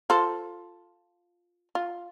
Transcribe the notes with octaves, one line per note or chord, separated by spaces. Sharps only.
F4 A4 C5
F4